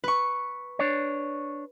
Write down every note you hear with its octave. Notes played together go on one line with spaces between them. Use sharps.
B4 C#6
D4 C#5